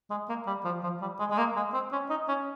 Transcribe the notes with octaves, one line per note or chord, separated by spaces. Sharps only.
G#3
A#3
G3
F3
F3
G3
G#3
G#3
A#3
G#3
C4
C#4
D#4
C#4